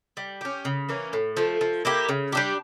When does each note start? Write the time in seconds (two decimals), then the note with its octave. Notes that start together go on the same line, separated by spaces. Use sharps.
0.17 G3
0.41 C#4 G4
0.65 C#3
0.89 E3 A#3 C#4
1.13 A2
1.37 F3 A3
1.61 F3
1.85 A#3 E4 G4
2.09 C#3
2.32 G3 D4 G4